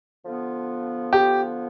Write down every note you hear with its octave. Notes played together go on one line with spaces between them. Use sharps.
D3 F3 B3 F4
G4